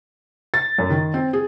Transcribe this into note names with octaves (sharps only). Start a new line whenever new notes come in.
A6
F#2
D#3
C4
G#4